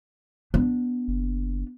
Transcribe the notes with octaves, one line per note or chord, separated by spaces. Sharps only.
B3 D4
F#1